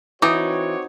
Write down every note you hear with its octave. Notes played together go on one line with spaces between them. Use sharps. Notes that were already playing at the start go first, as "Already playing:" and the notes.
E3 C4 D#4 F#4 C#5 D6 D#6